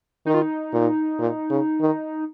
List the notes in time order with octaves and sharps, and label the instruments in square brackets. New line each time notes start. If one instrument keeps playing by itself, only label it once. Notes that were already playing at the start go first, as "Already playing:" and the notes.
[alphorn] D#3 [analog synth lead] D#4
[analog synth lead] F4
D#4
[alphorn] A#2
A#2
C#3
D#3